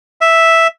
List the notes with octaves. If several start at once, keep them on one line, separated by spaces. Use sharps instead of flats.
E5